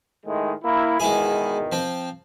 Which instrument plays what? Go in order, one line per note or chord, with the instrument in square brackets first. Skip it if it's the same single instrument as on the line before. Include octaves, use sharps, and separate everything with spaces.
[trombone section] A2 D#3 G#3
A#3 E4
[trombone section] E2 B2 D#3 [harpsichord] G#3 E4 G#4
[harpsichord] F3 C4